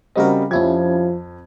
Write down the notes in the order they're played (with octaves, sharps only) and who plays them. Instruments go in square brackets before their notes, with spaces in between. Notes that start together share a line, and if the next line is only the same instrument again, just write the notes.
[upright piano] C#3 G3 D#5 [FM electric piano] C4 F#4 A#4
[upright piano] F2 G#6 [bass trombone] F3 [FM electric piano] C#4 E4 G4